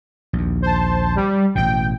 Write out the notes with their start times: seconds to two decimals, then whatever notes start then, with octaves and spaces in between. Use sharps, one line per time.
0.33 A#1 D#2
0.62 C5 A5
1.16 G3
1.55 A1 B2 G5